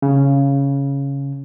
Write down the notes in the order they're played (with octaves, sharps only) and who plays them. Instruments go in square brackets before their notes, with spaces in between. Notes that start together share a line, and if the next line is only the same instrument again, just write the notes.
[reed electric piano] C#3